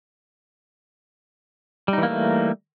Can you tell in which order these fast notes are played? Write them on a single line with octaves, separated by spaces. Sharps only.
G3 D#4 E3 A#3 A3